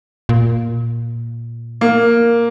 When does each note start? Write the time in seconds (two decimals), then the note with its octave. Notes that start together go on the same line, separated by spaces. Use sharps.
0.29 A#2
1.81 A#3